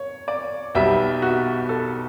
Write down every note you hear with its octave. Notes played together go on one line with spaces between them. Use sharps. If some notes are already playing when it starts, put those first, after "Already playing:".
Already playing: C#5
D5
B1 B2 G3 E5
F#4
A4